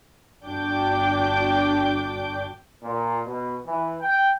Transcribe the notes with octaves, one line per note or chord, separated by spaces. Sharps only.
G1 D4 F#4 G5 D6 G6
A#2
B2
E3
G5